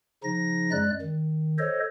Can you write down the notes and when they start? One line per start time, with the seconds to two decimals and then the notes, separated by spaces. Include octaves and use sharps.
0.24 C#3 F3 D#4 A#6
0.72 F#2 G#3 D5 F#6
1.02 D#3
1.59 A4 C5 C#5 D#5